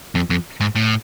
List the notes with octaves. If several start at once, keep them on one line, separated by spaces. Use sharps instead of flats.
F2
F2
G#2
A2